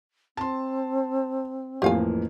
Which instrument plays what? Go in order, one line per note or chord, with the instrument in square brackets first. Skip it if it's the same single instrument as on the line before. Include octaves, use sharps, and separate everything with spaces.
[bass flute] C4 [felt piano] A5 C6
[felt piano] A1 F2 A#3 [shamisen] G4 F5 G#5